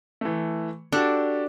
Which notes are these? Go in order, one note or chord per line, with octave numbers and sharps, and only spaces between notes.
E3 A3
D4 F#4 G4 A4